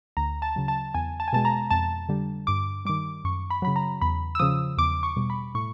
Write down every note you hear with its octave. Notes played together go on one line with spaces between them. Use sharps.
D2 A#5
A5
C#3 F#3
A5
E2 G#5
A5
G#5
B2 G#3 A5
A#5
F2 A5
D3 G3
G2 D6
D#3 G3 D6
F#2 C#6
B5
C#3 F#3 B5
A#5
E2 B5
E6
C#3 F3 D#6
E2 D6
C#6
B2 G3
B5
A2 C#6